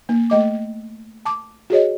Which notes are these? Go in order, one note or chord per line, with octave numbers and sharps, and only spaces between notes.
A#3
A3 D#5 D6
A5 D6
F#4 G#4 C#5 D#5